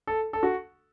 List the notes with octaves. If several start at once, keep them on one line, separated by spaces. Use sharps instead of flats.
A4
A4
F#4